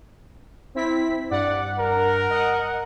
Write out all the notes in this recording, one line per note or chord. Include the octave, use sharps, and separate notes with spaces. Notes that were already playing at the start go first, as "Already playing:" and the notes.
C4 E4 B6
G2 D5 F#5
A#4
D#5 F#5